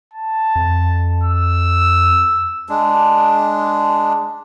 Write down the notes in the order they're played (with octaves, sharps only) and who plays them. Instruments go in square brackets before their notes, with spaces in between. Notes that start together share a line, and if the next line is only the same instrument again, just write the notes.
[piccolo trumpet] A5
[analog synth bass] F2
[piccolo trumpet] E6
[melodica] G#3 D4